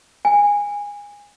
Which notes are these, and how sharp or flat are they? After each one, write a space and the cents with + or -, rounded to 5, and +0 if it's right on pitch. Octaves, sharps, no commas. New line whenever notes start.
G#5 -20